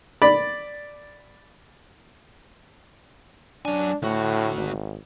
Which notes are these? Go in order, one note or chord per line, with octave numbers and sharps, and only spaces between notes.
D5 B5
F#3 D4 G#5
D2 A2 F#4
G#1